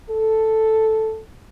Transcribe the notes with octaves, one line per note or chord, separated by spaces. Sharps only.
A4